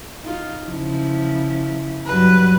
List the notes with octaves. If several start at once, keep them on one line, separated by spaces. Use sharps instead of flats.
D#4 F4
C#3 F3 E4
G2 F#3 B4